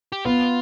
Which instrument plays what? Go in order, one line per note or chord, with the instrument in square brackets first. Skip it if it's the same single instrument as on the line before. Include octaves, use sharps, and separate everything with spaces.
[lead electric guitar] G4
[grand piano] B3 [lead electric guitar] F4